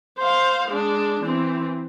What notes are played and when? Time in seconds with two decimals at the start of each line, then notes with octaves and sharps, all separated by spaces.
0.19 C5 F5
0.68 G#3 D4
1.22 E3 C4